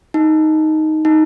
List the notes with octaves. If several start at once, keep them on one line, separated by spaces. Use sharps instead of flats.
D#4
D#4